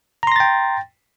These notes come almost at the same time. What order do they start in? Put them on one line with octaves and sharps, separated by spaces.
A#5 C6 A#6 A6 G5